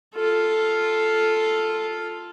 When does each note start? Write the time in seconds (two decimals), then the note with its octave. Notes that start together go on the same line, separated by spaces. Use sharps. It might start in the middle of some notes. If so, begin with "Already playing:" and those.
0.15 F4 A4